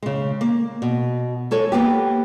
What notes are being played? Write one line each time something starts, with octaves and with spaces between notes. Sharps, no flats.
C#3 G#3
A#3
B2
G#3 A4 C#5
E3 A#3 B3 G4